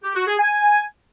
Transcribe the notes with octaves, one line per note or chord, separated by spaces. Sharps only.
G4
F#4
G#4
G#5